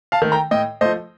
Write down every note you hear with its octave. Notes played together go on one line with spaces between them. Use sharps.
F5 A5
D#3 A3
G5 A#5
A2 D#5 G5
F3 A3 C5 D#5